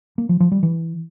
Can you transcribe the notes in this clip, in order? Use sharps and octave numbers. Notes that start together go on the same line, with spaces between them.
A#3
F3
F3
G3
E3